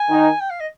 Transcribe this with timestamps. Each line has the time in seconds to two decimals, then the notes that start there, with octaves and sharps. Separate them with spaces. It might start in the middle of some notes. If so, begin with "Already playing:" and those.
Already playing: G#5
0.09 D#3 D#4
0.40 G5
0.50 F5
0.60 D#5